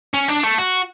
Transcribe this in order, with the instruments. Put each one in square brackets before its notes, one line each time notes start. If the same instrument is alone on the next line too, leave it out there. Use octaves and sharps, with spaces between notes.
[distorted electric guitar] C#4
D4
A3
F#4